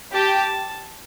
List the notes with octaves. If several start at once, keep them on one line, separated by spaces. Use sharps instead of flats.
G4 A5